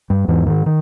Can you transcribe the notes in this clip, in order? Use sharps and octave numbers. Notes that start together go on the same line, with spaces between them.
G2 G3
E2 G#2 E3
D#3
D#3